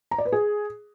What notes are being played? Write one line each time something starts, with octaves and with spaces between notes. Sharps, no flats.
A#5
D5
B4
G#4